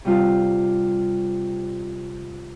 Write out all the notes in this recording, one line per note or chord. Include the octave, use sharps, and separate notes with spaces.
C3 G3 F4